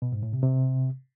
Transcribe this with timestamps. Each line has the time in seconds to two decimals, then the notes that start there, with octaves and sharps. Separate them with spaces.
0.02 B2
0.12 G#2
0.23 A2
0.33 C3
0.43 C3